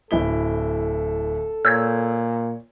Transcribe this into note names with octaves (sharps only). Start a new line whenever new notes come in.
D1 E4 A4 G7
A#2 C#5 E6 G6 G#6